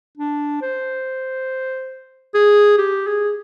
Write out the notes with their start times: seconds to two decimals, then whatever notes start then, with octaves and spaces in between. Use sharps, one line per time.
0.18 D4
0.62 C5
2.35 G#4
2.78 G4
3.07 G#4